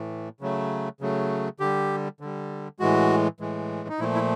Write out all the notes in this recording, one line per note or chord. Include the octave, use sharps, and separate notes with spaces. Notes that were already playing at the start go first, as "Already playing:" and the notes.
Already playing: A2 E3 A3
C#3 F#3 A3
C#3 F#3 A3
D3 G3 G4
D3 G3
A2 E3 G#3 F#4
A2 E3 G#3
D#4
A#2 F3 A3 E4
E4